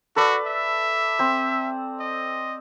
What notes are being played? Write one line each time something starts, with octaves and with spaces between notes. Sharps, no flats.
F#4 A4 B4 D5
E5
C4 C5
D#5